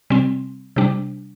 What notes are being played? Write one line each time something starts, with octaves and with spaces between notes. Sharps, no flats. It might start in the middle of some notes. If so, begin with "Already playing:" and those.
C3 G3 C4
C3 G3 D4